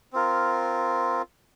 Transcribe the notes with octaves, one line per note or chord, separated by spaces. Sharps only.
C4 F4 A#4